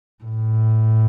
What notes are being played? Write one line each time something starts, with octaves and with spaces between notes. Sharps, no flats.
A2